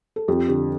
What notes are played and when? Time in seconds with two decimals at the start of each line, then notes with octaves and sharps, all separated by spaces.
0.16 A4
0.28 F2 G4
0.48 D3 G4